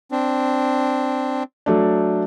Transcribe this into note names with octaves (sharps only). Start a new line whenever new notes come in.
C4 D4
F#3 A3 D4